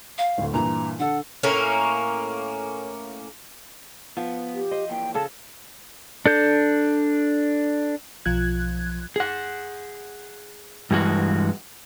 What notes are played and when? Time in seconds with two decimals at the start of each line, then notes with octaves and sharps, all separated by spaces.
0.18 F5
0.38 D1 D2
0.53 G2 A#2 E3 A#5
0.99 D3 A4 F#5
1.43 A2 A#3 C#4
4.17 F3 B3
4.54 G4
4.71 C5 D#5
4.90 E3 A#3 G5
5.15 C#3 A4 A5
6.26 D4 A4 G6
8.25 B1 F3 F4 F#6 G#6
9.16 G#4 F#5
10.91 G2 E3 G#3 F#4